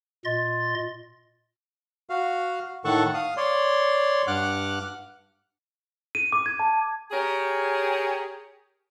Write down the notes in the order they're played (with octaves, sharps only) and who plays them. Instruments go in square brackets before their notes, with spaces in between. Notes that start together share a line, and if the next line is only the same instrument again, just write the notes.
[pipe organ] A#2 D#5 C6 A6
[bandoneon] F#4 F5
A2 D#3 A4 F#5 A5 C#6
F5 D#6
C#5 D5 C6
G2 F#5 D6 F6 F#6
[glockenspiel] D#7
D6
G#6
A5
[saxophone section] G4 G#4 A#4 C#5